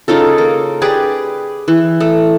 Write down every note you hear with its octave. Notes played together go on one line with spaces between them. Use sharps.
C#3 D#4 F4 A4
A#3
G4 G#4 B4 D5
E3
A3